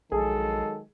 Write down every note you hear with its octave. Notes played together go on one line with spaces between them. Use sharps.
A#1 D#3 F#3 G#3 G#4 A4